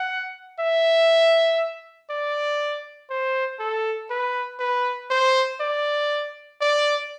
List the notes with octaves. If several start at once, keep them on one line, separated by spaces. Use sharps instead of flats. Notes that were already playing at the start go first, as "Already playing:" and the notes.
Already playing: F#5
E5
D5
C5
A4
B4
B4
C5
D5
D5